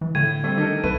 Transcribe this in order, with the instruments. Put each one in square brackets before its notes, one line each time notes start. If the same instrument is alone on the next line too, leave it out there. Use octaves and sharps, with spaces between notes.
[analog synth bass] E3
[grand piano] A2 [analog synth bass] D3 [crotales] G#6 D#7
[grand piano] G3 A3 C4
[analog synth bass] D#3 [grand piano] D#4 A4 A#4
[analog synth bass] C2 [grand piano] A3 B3 B4 [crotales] D#7